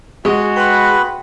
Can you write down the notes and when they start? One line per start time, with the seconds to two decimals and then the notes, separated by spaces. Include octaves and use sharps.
0.25 G#3 F#4 G#4 D#5 F#5
0.56 B4 G5 B5 C6